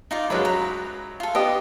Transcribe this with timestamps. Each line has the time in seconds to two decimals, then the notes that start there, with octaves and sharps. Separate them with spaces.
0.11 D#4 F4 D5
0.30 F#2 F#3 G#3 B4 F5 F#5
0.45 A#5 B5
1.20 F4 A4
1.35 B3 G4 D#5